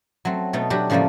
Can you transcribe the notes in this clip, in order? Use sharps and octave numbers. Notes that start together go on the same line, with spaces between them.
F#3 A3 C4
B2 A3 D#4
F#3 B3 D4 F#4 G4
A2 C#3 F3 G3 A3 A#3